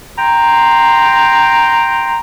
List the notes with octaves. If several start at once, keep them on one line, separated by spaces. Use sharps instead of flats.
G5 A#5 C6